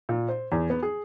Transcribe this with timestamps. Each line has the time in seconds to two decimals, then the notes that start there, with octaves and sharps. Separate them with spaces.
0.09 A#2
0.29 C5
0.52 E2
0.70 B3
0.83 G#4